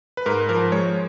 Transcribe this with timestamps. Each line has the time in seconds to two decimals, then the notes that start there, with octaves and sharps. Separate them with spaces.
0.17 B4
0.26 G#2 A#4
0.49 F3 A#4
0.72 G#3 C#5